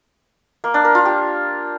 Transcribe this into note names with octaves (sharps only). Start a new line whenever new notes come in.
A#3
D4
A#4
F4
G4